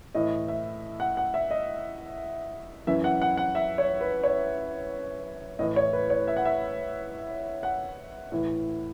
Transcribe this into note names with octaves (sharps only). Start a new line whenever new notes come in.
A2 E3 D#5
E5
F#5
F#5
E5
D#5
F#2 E3 E5
F#5
F#5
F#5
E5
C#5
B4
C#5
A2 E3 D#5
C#5
B4
C#5
E5
F#5
E5
F#5
A2 E3